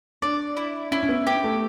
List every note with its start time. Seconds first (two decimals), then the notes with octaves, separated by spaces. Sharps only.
0.22 D4 D5
0.57 E4
0.91 C#4 E4
1.03 C#4
1.09 B3
1.26 B3 G4
1.44 A3